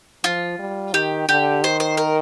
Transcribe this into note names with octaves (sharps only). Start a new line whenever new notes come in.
F3 F4
G3
D#3 G4
D3 G4
D#3 C5
C5
A#4